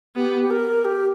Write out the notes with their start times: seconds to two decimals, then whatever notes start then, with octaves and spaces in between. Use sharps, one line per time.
0.16 B3 G4
0.42 G4
0.50 A#4
0.85 G4